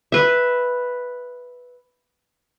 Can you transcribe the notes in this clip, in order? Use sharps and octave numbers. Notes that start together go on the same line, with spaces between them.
B4 E5